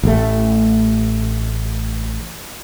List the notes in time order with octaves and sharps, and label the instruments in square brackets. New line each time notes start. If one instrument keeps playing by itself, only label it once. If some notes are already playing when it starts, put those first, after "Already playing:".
[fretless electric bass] A1 A3